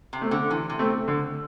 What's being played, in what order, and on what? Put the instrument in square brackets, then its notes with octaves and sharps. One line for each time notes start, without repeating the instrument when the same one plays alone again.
[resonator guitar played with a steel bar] C3
[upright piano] A3 C4
[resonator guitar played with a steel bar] D3
[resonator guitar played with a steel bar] C3 [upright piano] E3
[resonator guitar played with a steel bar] C3
[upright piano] A3 C4
D3